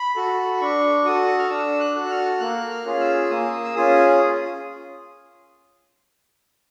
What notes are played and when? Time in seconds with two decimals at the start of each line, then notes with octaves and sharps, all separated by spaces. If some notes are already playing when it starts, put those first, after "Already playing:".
Already playing: B5
0.16 F#4 A4
0.61 D4 C#6
1.05 F#4 A4 D#6
1.39 F6
1.50 D4 E6
1.80 F#6
1.95 F#4 A4
2.10 F6
2.40 A#3 F#6
2.70 F6
2.85 C#4 F4 G#4
3.00 E6
3.30 A#3 D#6
3.64 E6
3.75 C#4 F4 G#4 D#6